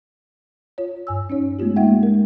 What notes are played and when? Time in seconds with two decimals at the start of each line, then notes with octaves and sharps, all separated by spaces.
0.78 F4 C#5
1.07 G2 G#5 E6
1.30 C#4 D#4 C#5
1.59 G#3 A3 B3 F4 G4
1.76 G#3 A#3 D#4 E5 F#5 G5
2.03 G#3 A#4